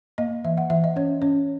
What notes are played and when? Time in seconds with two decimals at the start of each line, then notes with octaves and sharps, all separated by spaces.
0.18 A#3 D#5
0.44 E3 E5
0.57 F#5
0.70 E3 E5
0.84 D#5
0.96 C#4 C#5
1.22 C#4 C#5